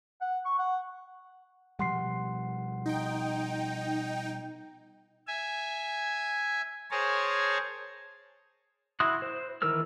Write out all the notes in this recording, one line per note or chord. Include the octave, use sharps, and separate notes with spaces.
F#5
C#6
F#5
B2 F3 G3 F#5 C6 C7
D#4 G5
E5 G#5
G#4 A#4 C5 C#5 G#5 A5
E4 F#4 C6 D#6 F#6
C5
D#3 E3 A#4 E6 F6